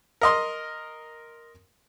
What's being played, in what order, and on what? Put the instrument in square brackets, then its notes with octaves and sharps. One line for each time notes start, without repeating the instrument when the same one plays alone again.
[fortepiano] A#4 D#5 C6